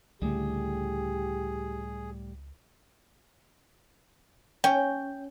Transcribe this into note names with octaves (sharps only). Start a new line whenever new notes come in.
C#2 A2 D3 G3 A3 G4 G#4
C#4 G5